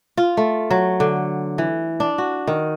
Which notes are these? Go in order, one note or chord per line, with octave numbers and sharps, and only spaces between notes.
F4
A3
F#3
D3
E3
D4
F#4
D#3